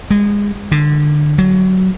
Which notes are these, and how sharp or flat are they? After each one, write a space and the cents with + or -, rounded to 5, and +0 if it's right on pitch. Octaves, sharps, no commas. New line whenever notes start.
G#3 -25
D3 +20
F#3 +15